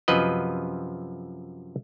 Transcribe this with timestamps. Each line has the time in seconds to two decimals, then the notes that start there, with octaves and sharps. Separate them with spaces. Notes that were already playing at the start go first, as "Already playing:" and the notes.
0.08 F#2 C3 F3 B4 D#5